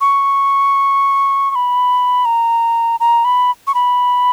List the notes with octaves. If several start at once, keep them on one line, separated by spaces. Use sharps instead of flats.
C#6
C#6
B5
A#5
A#5
B5
C#6
B5